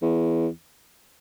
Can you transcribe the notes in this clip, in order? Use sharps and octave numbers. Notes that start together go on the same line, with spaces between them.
E2